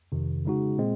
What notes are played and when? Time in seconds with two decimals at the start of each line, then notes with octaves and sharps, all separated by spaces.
0.12 F2 C3 D#3
0.45 C#3 G#3 D#4 F#4
0.79 A#2 G#3 C4